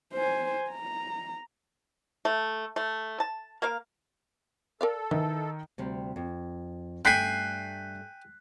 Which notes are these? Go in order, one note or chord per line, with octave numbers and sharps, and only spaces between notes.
C5 G#5
A#5
A3
A3
A5
A#3 A#4 F5
A4 A#4 D5 F5
D#3 E3
D2 C3 G3
F2
G2 A3 D4 G5 G#5 F#6 B6 C7